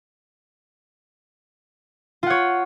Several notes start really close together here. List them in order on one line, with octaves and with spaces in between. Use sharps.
F4 F#5 C#5